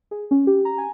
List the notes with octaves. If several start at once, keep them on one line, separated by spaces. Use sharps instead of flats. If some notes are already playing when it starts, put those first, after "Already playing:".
G#4
C#4
G4
A#5
G#5